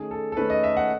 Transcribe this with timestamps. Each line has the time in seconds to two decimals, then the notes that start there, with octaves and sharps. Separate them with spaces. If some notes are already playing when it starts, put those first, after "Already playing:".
Already playing: D#3 A3 C#4 G#4
0.11 A4
0.32 A4
0.37 D#3 A3 C#4 B4
0.50 D#5
0.64 E5
0.77 F#5